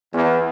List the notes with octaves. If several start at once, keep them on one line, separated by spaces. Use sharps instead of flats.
E2